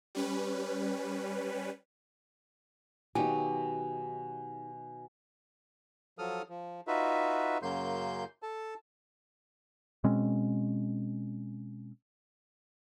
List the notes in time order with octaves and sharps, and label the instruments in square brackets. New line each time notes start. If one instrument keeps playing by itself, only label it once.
[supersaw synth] G3 C#4 B4
[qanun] B2 D#3 F#3 [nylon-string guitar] D#4 G4 [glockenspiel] G#5
[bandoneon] F3 F#3 A4 D#6 F6
F3
D#4 F4 F#4 B4 E5
F#2 C#3 F#3 A#3 C6 G6
A4 A5
[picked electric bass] B2 G#3 C4 C#4